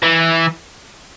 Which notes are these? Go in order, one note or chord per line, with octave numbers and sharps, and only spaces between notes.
E3